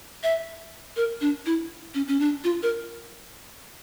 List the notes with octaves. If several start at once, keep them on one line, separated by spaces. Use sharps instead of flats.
E5
A#4
D4
E4
C#4
C#4
D4
F4
A#4